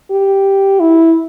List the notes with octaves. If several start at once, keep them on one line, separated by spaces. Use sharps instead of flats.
G4
E4